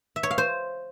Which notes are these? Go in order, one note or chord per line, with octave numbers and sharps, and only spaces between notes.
E5
C#5
F5
C5